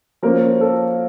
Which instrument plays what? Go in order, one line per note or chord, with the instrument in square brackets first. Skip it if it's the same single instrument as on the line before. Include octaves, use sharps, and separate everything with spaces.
[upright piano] F3 A#3 C#4 A#4
A4